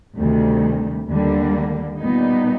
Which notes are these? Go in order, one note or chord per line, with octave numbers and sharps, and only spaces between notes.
D2 C3 D#3 G3
D#2 D3 G3 A#3
A#2 G3 B3 D#4